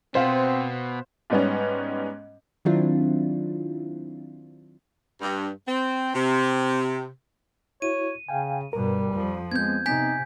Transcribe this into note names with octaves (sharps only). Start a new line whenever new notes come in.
B2 B3 C4 C5 F5 F#5
G#2 G3 B3 C#4
D#3 F#3 C4 D4 E4 F4
G2
C4
C3
E4 F#4 C#5 D#7
C#3 F5 G5 G#5
G2 B2 G3 A#4
F2 F3
G#3 B3 C4 G6 G#6
C3 D#4 G#5 G6 B6